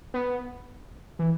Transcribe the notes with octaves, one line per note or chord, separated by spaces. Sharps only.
B3
E3